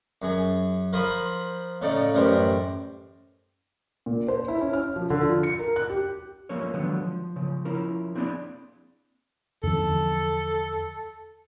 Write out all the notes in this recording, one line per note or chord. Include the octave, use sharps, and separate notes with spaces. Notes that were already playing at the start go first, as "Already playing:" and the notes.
F#2 G#4
F3 A#4 C5 B5 C6 D#6
A2 C#3 D#4 D5
A1 F#2 G3 A#4 C5 G5
A#2
C5
E4
C#4
F6
F3
D3
F4
C#7
A#4
F#6
G4
F3 A3 A#3 C#4 C#5
D3 D#3 F3 F#3 G#3 B3
F3
C#3 F3
F3 C#4 E4 A#4
A#3 C4 D4 E4 G#4 D5
E2 D3 F3 A4